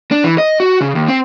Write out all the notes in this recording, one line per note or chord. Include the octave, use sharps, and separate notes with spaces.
D4
E3
D#5
F#4
C#3
D#2
C4